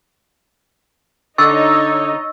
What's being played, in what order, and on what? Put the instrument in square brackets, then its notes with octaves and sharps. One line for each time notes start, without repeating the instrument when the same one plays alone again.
[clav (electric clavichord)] D3 [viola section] D#4 C#5 D#5 [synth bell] C#6 E6 A6